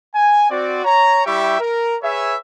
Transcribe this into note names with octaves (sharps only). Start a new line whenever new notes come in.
G#5
C4 F#4 D5
C#5 A#5
G3 E4 G4 E5 G5 C#6
A#4
G#4 B4 C#5 E5